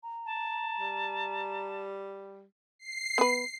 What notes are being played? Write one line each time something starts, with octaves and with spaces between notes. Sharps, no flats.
A#5
A5
G3
C7
B3 B4